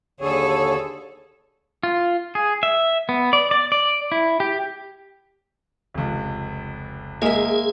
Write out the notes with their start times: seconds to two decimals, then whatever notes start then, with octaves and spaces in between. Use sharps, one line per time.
0.20 D#2 D3 G#4 A4 C#5
1.83 F4
2.35 G#4
2.63 E5
3.09 B3
3.33 D5
3.51 D5
3.72 D5
4.12 E4
4.40 G4
5.94 F1 C#2
7.22 G#3 A#3 G#4 E5